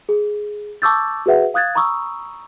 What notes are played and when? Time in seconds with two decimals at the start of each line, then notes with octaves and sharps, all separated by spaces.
0.09 G#4
0.82 A5 C#6 D6 E6 G6 A6
1.26 F#4 G#4 B4 E5 F#5
1.54 F5 D#6 F#6 G#6 A6
1.75 A#5 B5 C#6 D#6 E6